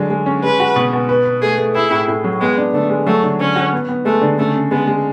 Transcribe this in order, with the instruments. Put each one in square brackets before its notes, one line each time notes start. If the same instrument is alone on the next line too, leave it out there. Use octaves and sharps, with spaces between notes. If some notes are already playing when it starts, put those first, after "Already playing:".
Already playing: [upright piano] D3 F#3 G#3
G#3
C#4
[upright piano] G#3 [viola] B4
[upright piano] F#4
B2
B2
B4
B4
[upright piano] A3 [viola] G#4
[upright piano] A3
[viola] E4 [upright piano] G#4
[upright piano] A2
A2
F#3
[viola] G#3 [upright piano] B3
[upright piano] D4
[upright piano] D3 [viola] A3
[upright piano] G#3
[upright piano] F#3 [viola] A3
[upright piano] D3
[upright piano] D3 [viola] C#4
[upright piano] F#4
B3
B3
[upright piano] G#3 [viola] A3
[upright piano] D3
[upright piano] C#3 [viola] A3
[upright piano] C#3
[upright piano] G#3 [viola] B3
[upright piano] G#3